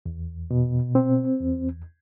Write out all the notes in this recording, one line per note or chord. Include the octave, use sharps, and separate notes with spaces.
E2
B2
C4
E2